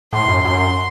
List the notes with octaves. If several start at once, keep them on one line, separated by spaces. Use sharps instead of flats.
A2 C6
F#2
F#2 C6